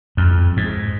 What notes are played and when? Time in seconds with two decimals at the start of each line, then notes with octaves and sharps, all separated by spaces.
0.17 F2
0.57 G#2